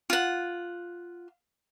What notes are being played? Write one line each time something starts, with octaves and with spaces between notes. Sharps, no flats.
F4 F#5